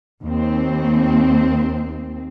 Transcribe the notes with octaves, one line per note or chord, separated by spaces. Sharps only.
D#2 C4